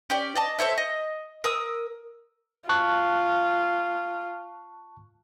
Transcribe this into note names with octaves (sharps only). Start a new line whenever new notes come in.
C#4 G4 D5
D5 D#5 A5
A4 C5 C#5 E5
D#5
A#4 D#6 E6
F4 A5 C#6 F#6